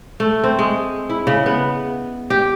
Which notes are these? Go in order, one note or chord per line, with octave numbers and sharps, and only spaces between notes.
A3
C4
G#3
E4
C#3
B3
G4